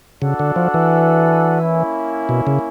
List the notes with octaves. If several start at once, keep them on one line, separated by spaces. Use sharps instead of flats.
C#3 D4 F#4 A4 D5 F#5
D3
F3
E3
A#3 C#4 E4
B2
C#3